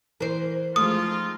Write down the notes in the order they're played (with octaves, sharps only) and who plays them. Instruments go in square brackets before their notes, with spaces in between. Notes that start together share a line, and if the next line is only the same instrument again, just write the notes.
[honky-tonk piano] E3 [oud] A#4 C5
[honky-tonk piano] F3 G#3 A3 [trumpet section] C4 D#4 F4 [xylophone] D#6